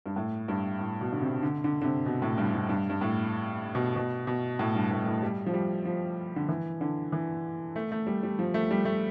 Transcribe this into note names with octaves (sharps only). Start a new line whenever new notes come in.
G2
A2
G2
A2
B2
D3
C3
D3
D3
D3
C3
B2
A2
G2
G2
G2
G2
A2
B2
B2
B2
A2
G2
A2
A2
G3
F3
G3
F3
D3
E3
D3
E3
A3
A3
G3
G3
F3
A3
G3
A3